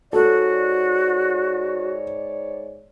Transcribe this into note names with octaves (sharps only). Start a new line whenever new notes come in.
G#2 F#4 A4 C#5 D5